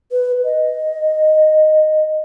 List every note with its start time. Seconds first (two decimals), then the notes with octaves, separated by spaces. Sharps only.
0.11 B4
0.44 D#5